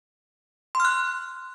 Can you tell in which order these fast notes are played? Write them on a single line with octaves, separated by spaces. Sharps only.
C6 F6 F#6